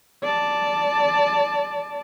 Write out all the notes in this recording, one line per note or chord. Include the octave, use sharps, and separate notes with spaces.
D5 A5